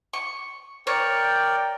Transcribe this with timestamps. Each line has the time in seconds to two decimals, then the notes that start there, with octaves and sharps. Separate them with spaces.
0.13 C#6
0.87 A#4 C#5 D5 G5